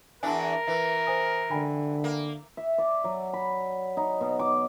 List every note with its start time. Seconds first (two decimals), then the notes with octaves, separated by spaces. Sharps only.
0.23 E2 E3 D4 A#4 G#5 A5
0.67 E3 B4 E5
1.07 C5 G#5 D#6
1.51 D3 G5 G#5 B5
2.04 A#3
2.57 E5
2.78 D5
3.04 F#3
3.33 B5
3.97 D#4
4.21 B2
4.39 D6